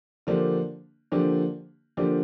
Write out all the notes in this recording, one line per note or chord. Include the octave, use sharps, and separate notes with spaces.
D3 F3 A#3 D4 G4
D3 F3 A#3 D4 G4
D3 F3 A#3 D4 G4